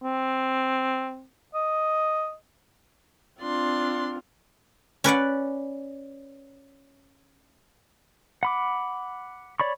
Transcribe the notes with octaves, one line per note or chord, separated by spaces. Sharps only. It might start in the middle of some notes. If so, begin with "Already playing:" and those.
C4
D#5
C4 D4 F4 C6
C#4 B4 D5 F#5
F#5 B5 D6
C#5 D5 B5 C#6